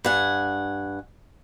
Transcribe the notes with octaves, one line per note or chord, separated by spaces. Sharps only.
G2 F#5 G#5